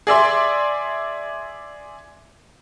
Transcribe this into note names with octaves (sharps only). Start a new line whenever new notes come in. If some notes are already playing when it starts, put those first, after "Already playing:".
G#4 D5 E5 C6